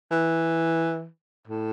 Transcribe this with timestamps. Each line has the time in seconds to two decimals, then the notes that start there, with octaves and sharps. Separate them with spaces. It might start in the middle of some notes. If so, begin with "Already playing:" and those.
0.11 E3
1.47 A2